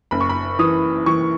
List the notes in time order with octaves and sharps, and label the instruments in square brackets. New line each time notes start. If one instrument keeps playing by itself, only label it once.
[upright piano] F#1 B5
C#6
B5
E3 D#6
E3 C#6